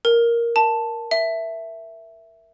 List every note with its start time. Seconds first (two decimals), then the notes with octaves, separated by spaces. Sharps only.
0.05 A#4
0.56 A5
1.11 E5